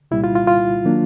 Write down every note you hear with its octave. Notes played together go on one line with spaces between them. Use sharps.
C2 A#2 G3 E4
F4
F4
F4
D#3 F#3 A#3 D4